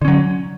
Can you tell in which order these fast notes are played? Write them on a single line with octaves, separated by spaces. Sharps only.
D3 C#4 F#3